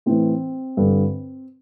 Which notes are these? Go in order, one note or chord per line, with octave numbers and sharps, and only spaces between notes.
A2 E3 C4
G2 D3